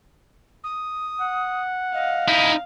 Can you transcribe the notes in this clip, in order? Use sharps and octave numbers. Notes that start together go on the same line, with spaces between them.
D#6
F#5
D#5 F5
D#4 E4